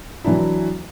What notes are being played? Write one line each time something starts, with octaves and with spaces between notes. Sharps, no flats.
E3 F#3 D4 E4